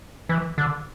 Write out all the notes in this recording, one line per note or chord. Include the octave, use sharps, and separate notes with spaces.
E3
D3